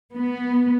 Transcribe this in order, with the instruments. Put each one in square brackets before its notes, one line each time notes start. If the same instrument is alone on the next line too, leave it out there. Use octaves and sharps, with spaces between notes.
[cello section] B3